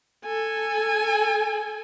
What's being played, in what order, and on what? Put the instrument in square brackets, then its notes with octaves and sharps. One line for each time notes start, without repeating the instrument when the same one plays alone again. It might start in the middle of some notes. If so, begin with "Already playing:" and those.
[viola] A4 G#5